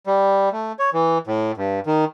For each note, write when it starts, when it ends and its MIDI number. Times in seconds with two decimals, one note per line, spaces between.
0.07 0.49 55
0.52 0.72 57
0.79 0.90 73
0.93 1.18 52
1.27 1.52 45
1.57 1.80 43
1.87 2.05 51